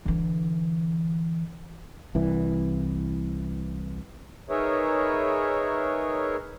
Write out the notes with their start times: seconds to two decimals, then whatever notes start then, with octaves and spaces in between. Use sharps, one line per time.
0.06 D3 E3
2.15 C2 E3
4.50 D#4 G#4 A#4 B4 C#5 E5